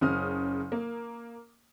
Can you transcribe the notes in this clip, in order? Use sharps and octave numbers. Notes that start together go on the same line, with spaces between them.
F#1 C#3 D#6 F6
A#3